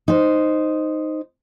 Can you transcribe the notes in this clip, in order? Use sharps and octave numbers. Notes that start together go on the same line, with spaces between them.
D#4 C5